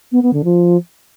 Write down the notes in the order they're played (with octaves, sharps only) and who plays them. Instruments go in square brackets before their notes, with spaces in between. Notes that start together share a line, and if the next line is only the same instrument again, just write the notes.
[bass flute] B3
B3
D3
F3